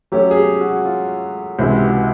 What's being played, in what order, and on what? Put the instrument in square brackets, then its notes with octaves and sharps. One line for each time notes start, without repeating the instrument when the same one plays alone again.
[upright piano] F#3 A3 C#4 [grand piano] G4
[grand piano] G#4
G4
F#4
F4
[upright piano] C#2 C3 E3 [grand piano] F#4
[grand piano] G4
F#4